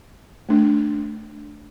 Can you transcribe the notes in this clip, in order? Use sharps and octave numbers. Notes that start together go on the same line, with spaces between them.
A3 D4